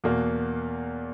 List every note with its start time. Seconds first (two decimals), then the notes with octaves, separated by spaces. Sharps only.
0.04 E2 B2 A#3